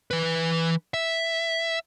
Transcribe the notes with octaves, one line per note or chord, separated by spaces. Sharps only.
E3 B4
E5